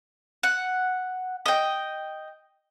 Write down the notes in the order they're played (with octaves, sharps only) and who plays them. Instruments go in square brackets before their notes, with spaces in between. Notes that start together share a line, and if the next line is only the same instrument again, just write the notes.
[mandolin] F#5
D#5 G5